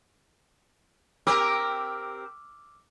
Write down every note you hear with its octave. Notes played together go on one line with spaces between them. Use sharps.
C4 G4 A#4 D6 E6 F6